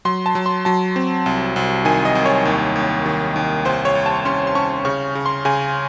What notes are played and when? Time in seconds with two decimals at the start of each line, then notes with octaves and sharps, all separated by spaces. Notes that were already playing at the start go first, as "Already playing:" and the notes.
0.05 F#3 C6
0.26 A5
0.35 F#3
0.46 C6
0.65 F#3 A5
0.96 C4
1.26 C2
1.56 C2
1.85 D#3 G#5
2.05 D#5
2.15 C2
2.26 C#5
2.45 D#2
2.76 D#2
3.06 D#3
3.36 D#2
3.65 C2 C5
3.85 C#5
3.95 C2
4.06 A5
4.25 C#4 C6
4.47 C6
4.55 C#4 C#6
4.85 C#3 C#6
5.15 C#3
5.26 C6
5.45 C#3 G#5